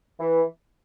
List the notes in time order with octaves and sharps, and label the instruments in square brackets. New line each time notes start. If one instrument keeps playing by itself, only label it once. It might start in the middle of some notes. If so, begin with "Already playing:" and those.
[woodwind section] E3